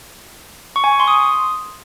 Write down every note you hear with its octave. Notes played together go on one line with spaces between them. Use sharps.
C#6
G#5
C#6
C6
D#6